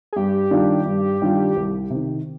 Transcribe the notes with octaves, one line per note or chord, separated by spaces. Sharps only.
G#4
G2 G4
D#3 G3 D4 F4
G2
D#3 G3 D4 F4
C2
C3 D#3